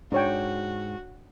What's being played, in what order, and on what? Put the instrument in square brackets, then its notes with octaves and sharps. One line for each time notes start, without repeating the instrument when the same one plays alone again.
[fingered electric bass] G#2 [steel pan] D4 C#5 G5 [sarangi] F#4